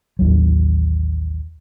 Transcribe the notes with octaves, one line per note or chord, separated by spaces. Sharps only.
A1 D#2 F#3